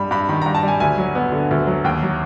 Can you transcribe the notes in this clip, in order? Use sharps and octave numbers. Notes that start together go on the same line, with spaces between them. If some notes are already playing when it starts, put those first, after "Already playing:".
Already playing: G2 G3 B5
G2 B5
D#3 B5
G2 A#5
A5
G3
G#5
D2 G#5
F#3
B3
D3
D2
F#3
D#2 G5
F#3